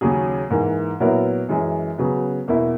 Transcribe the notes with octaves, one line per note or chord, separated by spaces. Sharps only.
D#2 C#3 F#3 C#4 G#4
G#2 E3 A#3
A#2 F#3 B3 E4 A#4
F#2 E3 G#3
C#3 F#3 B3
E2 B2 A#3 E4